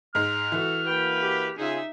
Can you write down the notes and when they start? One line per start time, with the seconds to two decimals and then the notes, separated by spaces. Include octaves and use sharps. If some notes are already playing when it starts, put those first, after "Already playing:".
0.15 G#2 G#3 F6
0.52 E3 F#4 A4
0.87 A#3 F#4 B4 G5
1.21 G4
1.58 C#3 D#4 F4 G#4 E5